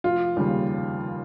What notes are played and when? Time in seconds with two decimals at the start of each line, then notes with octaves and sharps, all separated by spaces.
0.04 F1 F4
0.36 D#2 C#3 G3